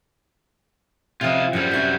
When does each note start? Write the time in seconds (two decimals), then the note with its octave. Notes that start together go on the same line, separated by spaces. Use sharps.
1.21 C3 F3 F4 D#5
1.53 F#2 F3 G3 G#4
1.71 C3 F#4